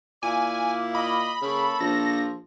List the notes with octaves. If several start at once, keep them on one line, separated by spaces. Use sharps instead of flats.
A#2 E4 D5 F5 G#5
D#5 B5
C#3 A#3 A4 C#5
A#1 F3 A#6